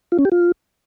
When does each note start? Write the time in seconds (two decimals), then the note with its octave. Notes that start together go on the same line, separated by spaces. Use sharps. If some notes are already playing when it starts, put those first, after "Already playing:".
0.12 F4
0.18 C#4
0.25 G4
0.32 F4